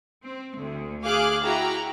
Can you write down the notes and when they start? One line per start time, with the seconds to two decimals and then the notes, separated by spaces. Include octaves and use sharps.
0.22 C4
0.55 D2
1.04 G#4 F5 G#5 D6 F6 F#6
1.44 E4 F#4 G5 A#5